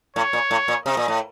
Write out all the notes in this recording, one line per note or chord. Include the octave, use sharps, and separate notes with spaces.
A2 C#5
A#2
A2
A#2
C3 D#5
A#2
A2